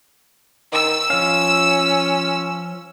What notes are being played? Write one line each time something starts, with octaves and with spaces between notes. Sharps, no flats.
D#3 E6
F3 C#4 F5